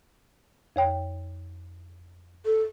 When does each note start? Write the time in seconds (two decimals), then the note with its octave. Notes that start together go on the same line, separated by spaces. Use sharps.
0.76 F2 C#5 G5
2.46 A4